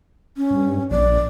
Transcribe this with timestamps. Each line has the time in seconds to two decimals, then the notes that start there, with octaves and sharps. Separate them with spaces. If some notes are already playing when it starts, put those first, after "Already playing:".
0.37 C#4
0.51 G2
0.90 A#1 D5